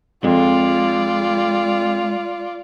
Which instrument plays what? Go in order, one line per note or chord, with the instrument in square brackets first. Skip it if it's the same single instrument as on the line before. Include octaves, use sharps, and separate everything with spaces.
[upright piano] F2 [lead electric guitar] G#3 [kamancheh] F4 D5